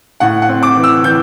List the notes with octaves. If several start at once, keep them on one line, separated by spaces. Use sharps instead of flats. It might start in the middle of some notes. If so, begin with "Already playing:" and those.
A2 F#5
F#5
C4
D6
E3
E6
E3 G6